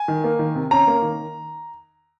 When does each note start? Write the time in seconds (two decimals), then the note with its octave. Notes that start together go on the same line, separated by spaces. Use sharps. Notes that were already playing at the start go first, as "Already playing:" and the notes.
Already playing: G#5
0.08 D#3
0.24 A#3
0.39 D#3
0.55 C3
0.71 C#4 A#5
0.87 A#3
1.02 D#3